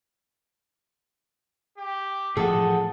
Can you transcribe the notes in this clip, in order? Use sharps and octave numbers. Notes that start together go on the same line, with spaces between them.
G4
A2 E3 F3 G#4 A4 F#5 D#6